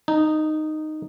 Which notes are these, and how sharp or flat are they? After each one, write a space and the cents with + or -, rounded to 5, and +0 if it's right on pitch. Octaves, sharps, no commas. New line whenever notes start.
D#4 -10